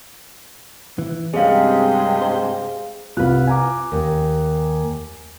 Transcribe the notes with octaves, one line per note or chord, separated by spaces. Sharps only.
E3
G2 C3 G3 G#3 C4 C#4 G#4 F5
C5
C2 F4 B4 F#6
G#5 A#5 D6
D#2